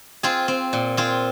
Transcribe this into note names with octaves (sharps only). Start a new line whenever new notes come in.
C4 F4 G#4
C4
A#2
C4 F4 G#4